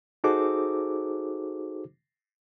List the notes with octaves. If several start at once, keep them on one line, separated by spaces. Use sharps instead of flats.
D#4 F#4 G#4 A4 C5 D6